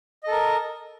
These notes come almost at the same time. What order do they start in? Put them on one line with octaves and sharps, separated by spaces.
D#5 A4 A#4